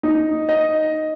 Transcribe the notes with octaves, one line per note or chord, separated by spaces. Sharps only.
D#4
D#5